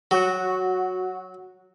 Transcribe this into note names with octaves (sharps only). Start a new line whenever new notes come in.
F#3 F#4